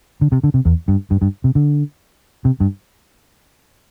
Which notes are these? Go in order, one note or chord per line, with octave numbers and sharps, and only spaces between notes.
D3
C3
D3
C3
E2
G2
G2
G2
C3
D3
C3
G2